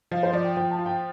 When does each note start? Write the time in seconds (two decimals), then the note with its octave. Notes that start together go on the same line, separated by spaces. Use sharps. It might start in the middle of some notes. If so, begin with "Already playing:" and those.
0.11 F3 F5
0.23 C5
0.33 F3 D5
0.44 G5
0.57 F3 G5
0.71 A5
0.79 F4
0.86 G5